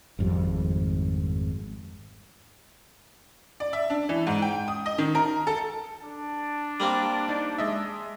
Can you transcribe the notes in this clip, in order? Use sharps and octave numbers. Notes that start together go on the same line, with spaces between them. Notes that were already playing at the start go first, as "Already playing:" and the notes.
G#1 F2 G3
D5
E5
D4
E3
G#2
G5
D#6
D#5
D#3
A#4
A4
D4
G3 A#3 C4
D#4 D5
G#3 D#5 E5